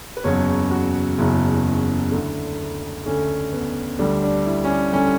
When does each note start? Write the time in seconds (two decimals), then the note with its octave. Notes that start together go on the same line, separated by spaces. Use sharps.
0.17 B4
0.24 F#1 E2 C#3 F#3 C#5
0.71 F#4
1.18 F#1 E2 C#3 F#3 E4
2.11 D2 D3 A3
3.05 D2 D3 A3 C#4
3.53 B3
3.99 D2 D3 G3 D4
4.23 D4
4.45 E4
4.64 C#4
4.70 D4
4.93 D3 G3 C#4